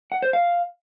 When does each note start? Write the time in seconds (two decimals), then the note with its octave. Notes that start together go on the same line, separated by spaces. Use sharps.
0.12 F#5
0.22 C5
0.33 F5